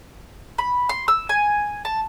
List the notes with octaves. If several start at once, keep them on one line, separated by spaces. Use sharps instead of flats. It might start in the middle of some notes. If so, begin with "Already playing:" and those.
B5
C6
E6
G#5
A5